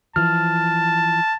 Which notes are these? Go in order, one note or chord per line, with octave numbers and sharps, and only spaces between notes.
E3 F3 A5 F6